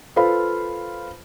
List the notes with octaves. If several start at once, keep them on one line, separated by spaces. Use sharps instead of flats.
F4 A4 B4 C5 F5 B5